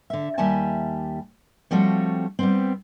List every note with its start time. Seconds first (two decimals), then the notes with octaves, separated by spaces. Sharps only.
0.10 D3 E5
0.38 D#2 G3 G4 E5 G#5 A5
1.71 F3 G3 A3 C4 F#4 C#5
2.39 G3 B3 C4